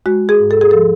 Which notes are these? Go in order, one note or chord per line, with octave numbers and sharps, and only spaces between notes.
G#3 F#4
G#4
G#2
A4
G#4
F3 A4